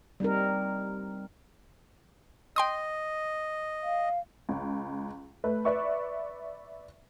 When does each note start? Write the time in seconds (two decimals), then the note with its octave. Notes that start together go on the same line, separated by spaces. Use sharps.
0.20 G3 C4 D#4 A#4
2.56 D#5 G5 C6 D#6
3.83 F5
4.49 C#2
5.44 A3 B4
5.65 B4 D5 E5 C#6